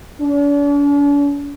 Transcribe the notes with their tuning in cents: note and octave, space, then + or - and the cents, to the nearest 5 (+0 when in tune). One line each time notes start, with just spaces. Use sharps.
D4 -45